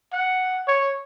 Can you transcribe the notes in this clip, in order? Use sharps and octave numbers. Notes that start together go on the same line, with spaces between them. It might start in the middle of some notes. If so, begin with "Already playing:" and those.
F#5
C#5